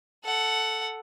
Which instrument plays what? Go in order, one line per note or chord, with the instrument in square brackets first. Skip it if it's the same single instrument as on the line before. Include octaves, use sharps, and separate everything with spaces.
[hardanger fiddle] A4 F#5